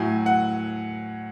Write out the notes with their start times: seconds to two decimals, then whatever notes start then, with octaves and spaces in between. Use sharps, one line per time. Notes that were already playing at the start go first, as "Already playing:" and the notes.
Already playing: A2 F#3 G#5
0.26 F#5